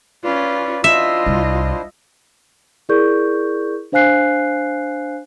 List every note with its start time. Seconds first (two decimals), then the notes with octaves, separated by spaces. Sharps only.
0.24 C#4 F4 B4 D5
0.84 D4 E4 F4 C5 D#5 E5
1.26 C2
2.89 E4 G#4 A#4 D5 C#6 G6
3.92 D4 C5 F5 G#5 F#6 C7